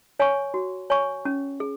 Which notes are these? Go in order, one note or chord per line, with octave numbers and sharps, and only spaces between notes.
C#5 G#5 C#6
F#4
C#5 G#5 C#6
C#4
G#4